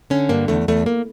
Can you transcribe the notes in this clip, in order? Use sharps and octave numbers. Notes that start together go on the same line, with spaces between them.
D3 C#4
G2 A#3
E2 A3
E2 A3
A#3